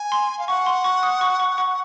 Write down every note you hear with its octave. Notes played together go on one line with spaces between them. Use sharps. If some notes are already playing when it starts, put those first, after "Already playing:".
Already playing: G#5
C6
F5
F#5 C#6
C6
C#6
D#6
C#6
C#6
C#6